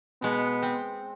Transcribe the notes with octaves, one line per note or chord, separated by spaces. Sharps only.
B2 G#3 B3
C4